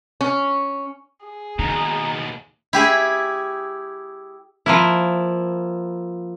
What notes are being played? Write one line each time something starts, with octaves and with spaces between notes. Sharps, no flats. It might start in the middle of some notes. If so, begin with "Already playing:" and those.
C#4
G#4
D#2 B2 D#3 A#5
E4 G4 G#4 E5
F3 A#3 E4